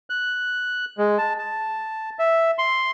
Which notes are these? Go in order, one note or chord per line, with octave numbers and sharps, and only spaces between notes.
F#6
G#3
A5
A5
E5
C6